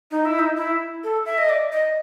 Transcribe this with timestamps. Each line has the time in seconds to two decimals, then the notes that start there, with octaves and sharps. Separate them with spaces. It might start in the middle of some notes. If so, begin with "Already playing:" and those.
0.11 D#4
0.25 E4
0.39 D#4
0.57 E4
1.04 A4
1.26 E5
1.38 D#5
1.49 D5
1.72 D#5